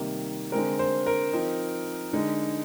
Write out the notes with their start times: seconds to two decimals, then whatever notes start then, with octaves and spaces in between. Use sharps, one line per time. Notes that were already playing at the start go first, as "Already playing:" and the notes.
Already playing: C3 D#3 G3 A#3 D#4
0.52 D3 G#3 C4 A#4
0.79 C5
1.06 A#4
1.33 F3 C4 D#4
2.13 D3 G#3 D#4